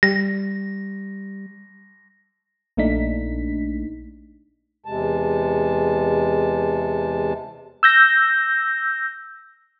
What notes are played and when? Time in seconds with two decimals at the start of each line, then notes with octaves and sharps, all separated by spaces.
0.03 G3 A#6
2.77 A#1 A#2 A3 D4 D#4 B6
4.85 E2 C3 G#3 A5
7.83 E6 G6 A#6